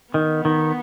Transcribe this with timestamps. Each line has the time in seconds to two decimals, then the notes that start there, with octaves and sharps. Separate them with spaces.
0.14 D#3 B3
0.45 D#3